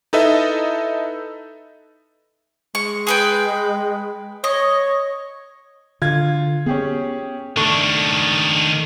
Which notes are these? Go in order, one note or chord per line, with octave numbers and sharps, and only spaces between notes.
D#4 E4 A4 B4 D#5 E5
G#3 C#6
G#4 B4 G5
C#5 D#5
D3 F4 G#6
B3 C#4 G4 G#4
D#3 A3 D4 C#6 F#7